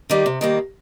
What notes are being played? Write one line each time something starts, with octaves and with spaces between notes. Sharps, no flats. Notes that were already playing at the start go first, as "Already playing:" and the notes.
D#3 G3 A#3
C3
D#3 G3 A#3